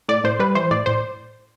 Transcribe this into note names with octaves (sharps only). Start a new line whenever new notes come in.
A2 D5
A2 C5
G3 B4
E3 C5
A2 D5
A2 C5